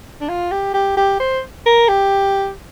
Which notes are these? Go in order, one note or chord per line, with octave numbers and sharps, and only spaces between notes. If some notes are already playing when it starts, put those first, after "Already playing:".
D4
F4
G4
G4
G4
C5
A#4
G4